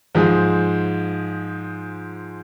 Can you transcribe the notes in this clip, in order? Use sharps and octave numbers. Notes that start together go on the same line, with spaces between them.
G#2 F3 G#4